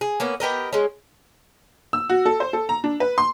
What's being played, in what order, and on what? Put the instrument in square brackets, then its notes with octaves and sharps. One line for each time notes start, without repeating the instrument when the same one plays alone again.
[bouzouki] G#4
A#3 B3 C#4
B3 G4 A#4 D#5
G#3 C#4
[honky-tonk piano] E6
F#4
A4
C5
A4
A#5
D4
B4
C6